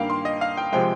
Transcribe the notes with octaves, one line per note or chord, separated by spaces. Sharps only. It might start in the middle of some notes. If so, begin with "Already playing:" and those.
Already playing: G2 D#3 A#3 F5 G5
C6
D#5
F5
G5
C3 F3 G#3 G5